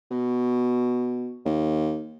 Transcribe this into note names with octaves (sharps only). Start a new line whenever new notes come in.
B2
D#2